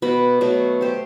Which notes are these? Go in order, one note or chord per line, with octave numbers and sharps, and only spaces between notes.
B2 F#4 B5
B2 F#3 A3
G4 C5